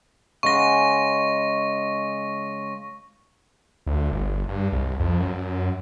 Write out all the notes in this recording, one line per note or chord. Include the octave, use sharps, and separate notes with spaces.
C#3 G#3 F#5 C#6 A#6
D2
G1
G2
C2
F2
F#2